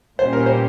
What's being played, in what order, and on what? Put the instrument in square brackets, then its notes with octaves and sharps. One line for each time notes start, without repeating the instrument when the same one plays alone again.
[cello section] A#2 G3 C#4 G4 [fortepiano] C5
[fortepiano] A#4
C5